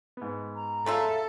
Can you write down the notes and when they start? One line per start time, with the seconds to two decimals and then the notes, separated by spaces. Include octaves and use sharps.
0.17 G#2 B3
0.55 A#5
0.86 C#3 F4 A4 E5